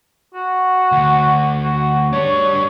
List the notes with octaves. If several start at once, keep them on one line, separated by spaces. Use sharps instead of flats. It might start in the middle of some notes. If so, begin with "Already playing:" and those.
F#4
D2
F#4
G3 D4 C#5